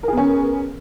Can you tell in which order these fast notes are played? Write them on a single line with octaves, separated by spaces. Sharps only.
A#4 G#4 B3 C#4